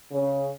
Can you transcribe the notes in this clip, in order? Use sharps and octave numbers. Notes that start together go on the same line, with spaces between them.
C#3